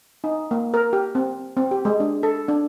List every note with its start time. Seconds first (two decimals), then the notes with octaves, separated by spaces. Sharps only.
0.24 D#4
0.51 A#3
0.74 A#4
0.93 G4
1.15 C4
1.57 C4
1.71 G4
1.85 G#3
2.00 D4
2.23 A4
2.49 D4